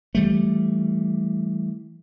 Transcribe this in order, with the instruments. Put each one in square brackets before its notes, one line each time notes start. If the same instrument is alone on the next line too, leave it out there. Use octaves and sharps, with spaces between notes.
[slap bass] E3 G3 A3